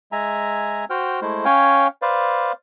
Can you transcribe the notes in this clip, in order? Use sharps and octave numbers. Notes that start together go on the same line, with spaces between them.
G#3 E5 G#5 A#5
F#4 C5 G5 F6
G#3 A3 E4 C5
C#4 C#5 F5 G5 G#5
B4 C5 D5 F5